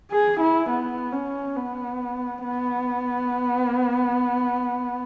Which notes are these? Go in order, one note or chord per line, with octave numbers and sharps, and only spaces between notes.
G#4
E4
B3
C#4
B3
B3